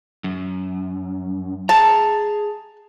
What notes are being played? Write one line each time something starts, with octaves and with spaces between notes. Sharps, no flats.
F#2
G#4 A5 A#5